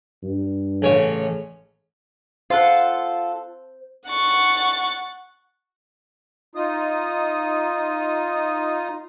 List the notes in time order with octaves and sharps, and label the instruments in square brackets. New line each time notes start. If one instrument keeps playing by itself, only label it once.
[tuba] G2
[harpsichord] A1 C#3 C#5
[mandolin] F4 A4 F#5 [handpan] C5
[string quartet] F#5 C#6 A6
[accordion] D#4 F4 D#6